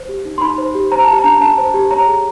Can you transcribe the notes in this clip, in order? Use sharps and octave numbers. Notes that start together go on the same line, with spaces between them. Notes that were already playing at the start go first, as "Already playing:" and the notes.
Already playing: C5
G4
D#4
C6
D#4 B5
C5
G4
C5 A#5
G4 A5
A#5
D4
D4 A5
C5
G4
C#5 A#5
G#4